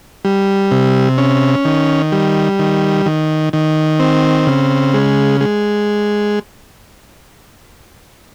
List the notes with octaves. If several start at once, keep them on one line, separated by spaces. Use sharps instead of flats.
G3
C3
C#4
D#3
G3
D#3
D#3
D#3
C4
C#3
G#3
G#3